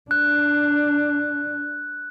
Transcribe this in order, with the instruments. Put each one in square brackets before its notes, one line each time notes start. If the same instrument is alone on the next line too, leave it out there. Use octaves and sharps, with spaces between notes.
[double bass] D4 [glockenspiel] F#6